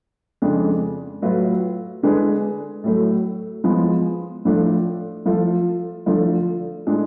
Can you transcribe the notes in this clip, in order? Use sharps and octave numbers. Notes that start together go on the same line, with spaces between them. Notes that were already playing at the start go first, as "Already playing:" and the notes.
F2 C#3 G#3 D4
A2 F#3 A3 F4 B4
D3 G#3 D4 G#4 B4
A2 F#3 A3
F3 G#3 B3
A2 F3 A3 D4
F3 A3 F4 A4
D3 F3 A3 F4
A2 G#3 D4